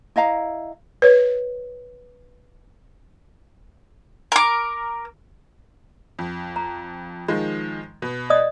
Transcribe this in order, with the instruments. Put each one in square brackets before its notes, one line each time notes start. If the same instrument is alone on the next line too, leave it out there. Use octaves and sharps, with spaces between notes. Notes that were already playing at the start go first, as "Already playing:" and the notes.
[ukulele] E4 D#5 F5 A#5
[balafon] B4 C#5
[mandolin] A#4 D6
[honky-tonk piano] F2
[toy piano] A#5
[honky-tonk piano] D#3 F3 G#3
B2
[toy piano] D5 D#5 D#6